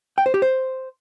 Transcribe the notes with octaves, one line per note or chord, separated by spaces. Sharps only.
G5
C5
G4
C5